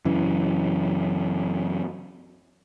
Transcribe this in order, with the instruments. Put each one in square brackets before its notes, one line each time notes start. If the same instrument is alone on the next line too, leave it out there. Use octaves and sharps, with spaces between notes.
[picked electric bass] F#2 C#3 E3